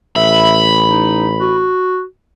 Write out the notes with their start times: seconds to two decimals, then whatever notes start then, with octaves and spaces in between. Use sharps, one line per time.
0.16 A1 E5 B5
0.89 D#4
1.40 F#4